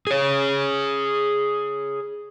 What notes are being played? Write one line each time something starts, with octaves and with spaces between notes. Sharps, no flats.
G#4 C#5